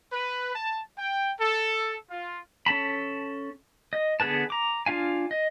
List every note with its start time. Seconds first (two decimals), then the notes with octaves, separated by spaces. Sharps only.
0.12 B4
0.55 A5
0.98 G5
1.40 A4
2.11 F4
2.66 C#4 A4 A5 B5
3.93 D#5
4.20 D3 B3 G#4 B4 A5
4.50 A#5 D6
4.86 D4 F4 F5 G#5
5.31 D#5